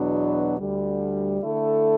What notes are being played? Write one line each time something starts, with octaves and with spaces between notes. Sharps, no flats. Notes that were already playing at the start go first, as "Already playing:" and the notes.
Already playing: E2 B2 F#3 B3 D4
D2 D3 G3
D3 A3 E4 A4